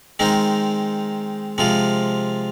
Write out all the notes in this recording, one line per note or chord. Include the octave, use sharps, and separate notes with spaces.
D#3 G#3 C4 D#4
C3 F3 G#3 F4